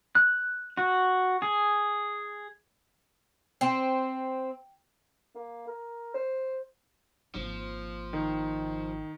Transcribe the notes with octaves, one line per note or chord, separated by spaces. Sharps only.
F#6
F#4
G#4
C4
A#3
A#4
C5
G#1 F3 A#3
D#3